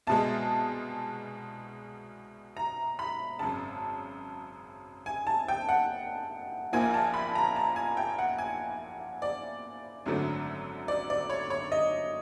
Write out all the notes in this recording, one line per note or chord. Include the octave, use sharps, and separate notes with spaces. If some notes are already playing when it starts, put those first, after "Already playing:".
C2 B2 G#3 A5
A#5
B5
G#1 F#2 C#3 A5
G#5
A5
G5
F#5
A#1 A#2 F3 A#3 G#5
A5
B5
A#5
A5
G#5
G5
F#5
G#5
D5
G#1 F#2 D3 F#3 A3
D5
D5
C#5
C#5
D#5